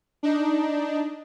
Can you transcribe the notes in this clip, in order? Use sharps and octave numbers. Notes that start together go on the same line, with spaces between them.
D4 D#4